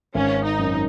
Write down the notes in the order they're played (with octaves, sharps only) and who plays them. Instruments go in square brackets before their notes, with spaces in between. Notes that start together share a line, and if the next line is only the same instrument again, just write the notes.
[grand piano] G#1 [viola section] C#4
[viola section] D#4
[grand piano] F#2